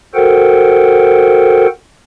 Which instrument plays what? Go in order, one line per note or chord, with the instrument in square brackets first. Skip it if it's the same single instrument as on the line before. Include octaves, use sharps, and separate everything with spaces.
[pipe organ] F#4 A4 A#4 C5 F#5 G5